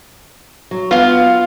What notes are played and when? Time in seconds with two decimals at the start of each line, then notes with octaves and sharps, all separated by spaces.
0.71 F#3
0.91 B3 F4 F5